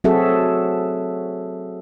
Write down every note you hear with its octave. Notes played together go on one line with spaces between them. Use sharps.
F#3 C4 F#4 G#4 A4 E5